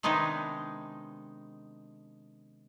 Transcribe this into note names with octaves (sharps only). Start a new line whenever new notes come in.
C3 D#3 G#3 B3 D4 D#4